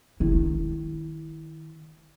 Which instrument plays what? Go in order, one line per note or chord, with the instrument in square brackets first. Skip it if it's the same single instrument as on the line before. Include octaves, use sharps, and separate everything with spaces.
[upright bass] D#3 E4